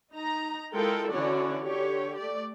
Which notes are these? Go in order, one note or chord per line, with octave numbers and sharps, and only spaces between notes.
D#4 A#5
G#3 E4 F4 A4 A#4 G5
D3 E3 C#4 F#4 C#5 D5
D3 G4 C#5
A3 D5